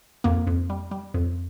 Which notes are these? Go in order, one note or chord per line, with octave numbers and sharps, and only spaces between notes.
F2 A#3
F2
G3
G3
F2